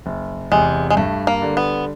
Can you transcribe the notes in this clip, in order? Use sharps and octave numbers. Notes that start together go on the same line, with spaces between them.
F#1
E2 C3 G#3
G#3
G2 A3
A#3
D3 G3
B3